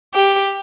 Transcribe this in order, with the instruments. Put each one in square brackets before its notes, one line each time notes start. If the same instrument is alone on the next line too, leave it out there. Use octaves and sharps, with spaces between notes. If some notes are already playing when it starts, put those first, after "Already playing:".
[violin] G4